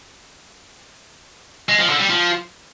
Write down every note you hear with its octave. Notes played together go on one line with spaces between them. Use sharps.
G#3
F3
D3
G3
F3